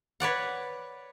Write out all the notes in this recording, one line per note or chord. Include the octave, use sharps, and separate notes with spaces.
B4 C#5 D5 F#5